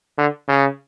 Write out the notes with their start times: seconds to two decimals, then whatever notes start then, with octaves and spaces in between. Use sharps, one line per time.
0.18 D3
0.48 C#3